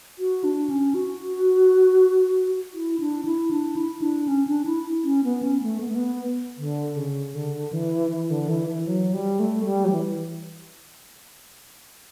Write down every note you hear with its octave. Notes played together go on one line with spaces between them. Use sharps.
F#4
D4
C#4
F#4
E4
D4
E4
D4
E4
D4
C#4
D4
E4
C#4
B3
C#4
A3
B3
A3
B3
D3
C#3
D3
E3
E3
D3
E3
E3
F#3
G3
A3
G3
F#3
E3